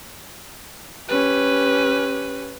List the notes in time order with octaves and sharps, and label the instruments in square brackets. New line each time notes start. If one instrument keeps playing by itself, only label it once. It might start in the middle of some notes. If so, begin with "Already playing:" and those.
[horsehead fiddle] C#4 G4 [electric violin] B4